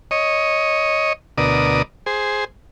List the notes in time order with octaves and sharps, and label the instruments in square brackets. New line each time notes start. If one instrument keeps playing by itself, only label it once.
[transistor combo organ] C#5 D#5
D2 B2 A#4 D5 D#6
G#4 C5